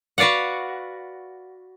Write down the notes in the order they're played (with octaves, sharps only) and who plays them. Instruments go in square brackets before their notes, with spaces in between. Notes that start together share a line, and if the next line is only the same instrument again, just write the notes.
[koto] F#4 B4 D5 F5 F#5